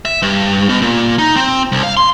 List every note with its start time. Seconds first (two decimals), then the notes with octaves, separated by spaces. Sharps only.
0.05 E5
0.22 G2
0.69 B2
0.82 A#2
1.18 D#4
1.36 C4
1.72 C2
1.84 F5
1.97 C6